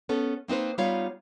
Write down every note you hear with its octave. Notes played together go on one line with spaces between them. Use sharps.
B3 C#4 A4
A#3 C4 D#4 B4 C5
G3 B3 D#4 F4 C#5 F5